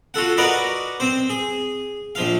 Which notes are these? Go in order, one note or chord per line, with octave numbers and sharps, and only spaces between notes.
F4 F#4 A4 F#5
F#4 A#4 B4 D5 D#5 F#5
C4 C5
G#4
A#1 F3 F5